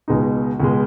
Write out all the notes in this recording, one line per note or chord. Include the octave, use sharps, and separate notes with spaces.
C#2 B2 G#3 D#4
C#2 B2 G#3